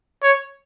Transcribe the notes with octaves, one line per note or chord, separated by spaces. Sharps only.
C#5